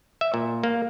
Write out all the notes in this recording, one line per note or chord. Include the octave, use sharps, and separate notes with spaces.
E5
A#2
A#3